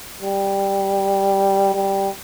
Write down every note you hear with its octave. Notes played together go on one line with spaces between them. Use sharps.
G3
G3